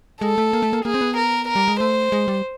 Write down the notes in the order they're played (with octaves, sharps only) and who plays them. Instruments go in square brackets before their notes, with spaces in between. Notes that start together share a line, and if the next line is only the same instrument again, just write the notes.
[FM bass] G#3 [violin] A4
[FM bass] A3
A#3
A3
A#3
[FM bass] A#3 [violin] G#4
[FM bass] C4
B3
[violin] A#4
A#4
[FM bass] G3
G#3
[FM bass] A3 [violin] C5
[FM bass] G#3
G3